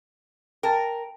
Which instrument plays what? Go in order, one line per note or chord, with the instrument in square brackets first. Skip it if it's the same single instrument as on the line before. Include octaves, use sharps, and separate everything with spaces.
[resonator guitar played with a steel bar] A#4 [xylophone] G5 A5 A6